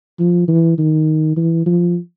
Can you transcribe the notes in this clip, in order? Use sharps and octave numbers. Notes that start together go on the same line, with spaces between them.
F3
E3
D#3
E3
F3